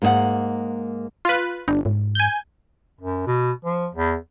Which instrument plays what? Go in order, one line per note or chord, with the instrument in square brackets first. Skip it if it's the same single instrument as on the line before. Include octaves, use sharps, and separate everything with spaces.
[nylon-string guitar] G#2 A#3 G#4 D#5 F#5
[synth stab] F4 B4
[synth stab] G1 [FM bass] D4
[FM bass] G#2
[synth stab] G#5 G6
[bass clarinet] F#2
B2
F3
E2